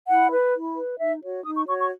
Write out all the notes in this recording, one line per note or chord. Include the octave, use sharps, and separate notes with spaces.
E4 F#5
B4
E4
B4
D#4 E5
F#4 C#5
D#4 D#6
C#6
F#4 C#5 C#6
C#6